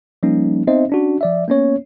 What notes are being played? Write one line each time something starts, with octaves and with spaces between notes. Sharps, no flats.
F3 G3 A#3 C#4 D#4
B3 C4 D#4 C5 D#5 E5
C#4 D4 F#4
F3 D5 E5
A#3 B3 C#4 C#5